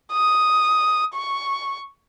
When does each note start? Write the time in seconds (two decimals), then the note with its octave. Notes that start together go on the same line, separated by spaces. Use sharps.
0.12 D#6
1.15 C#6